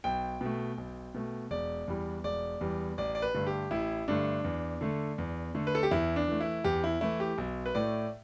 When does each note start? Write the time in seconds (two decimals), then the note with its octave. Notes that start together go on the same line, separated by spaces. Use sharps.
0.04 B1 G5
0.41 B2 A3
0.78 B1
1.15 B2 A3
1.51 E1 D5
1.88 E2 E3 G3
2.24 E1 D5
2.61 E2 E3 G3
2.98 A1 D5
3.15 D5
3.22 B4
3.34 G2 D3 A3
3.47 G4
3.71 A1 E4
4.08 G2 D3 A3 D4
4.44 E2
4.81 D3 A3
5.18 E2
5.54 D3 A3
5.67 B4
5.75 A4
5.83 G4
5.91 E2 E4
6.16 D4
6.28 E3 A3
6.41 E4
6.64 E2 G4
6.84 E4
7.01 E3 A3 E4
7.20 G4
7.38 B1
7.66 B4
7.75 A2 A3 D5